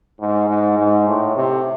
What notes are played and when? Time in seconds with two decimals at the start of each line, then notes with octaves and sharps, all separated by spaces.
0.20 G#2
0.49 G#2
0.78 G#2
1.08 A2
1.37 C3